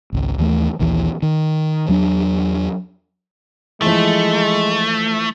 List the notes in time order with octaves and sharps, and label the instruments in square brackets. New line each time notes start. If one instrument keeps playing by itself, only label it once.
[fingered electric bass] G#1 C#2
D#2 E3 A3
A#1 D#2 E3
D#3
E2 F#3 C#4 D4
[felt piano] E3 F3 [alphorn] G#3 [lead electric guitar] A3